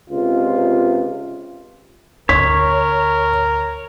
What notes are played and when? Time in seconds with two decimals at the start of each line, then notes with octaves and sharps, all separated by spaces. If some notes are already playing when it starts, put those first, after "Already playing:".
0.10 C#2 C3 F4
2.29 D2 A#4 C#5 B6